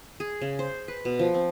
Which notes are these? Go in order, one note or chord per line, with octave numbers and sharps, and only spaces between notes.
G#4
C#3
C5
B4
B2
F3
C4